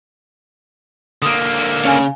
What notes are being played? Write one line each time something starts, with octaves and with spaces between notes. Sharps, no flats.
D3 A#3 D#6
C#3 C#4 F5 G#5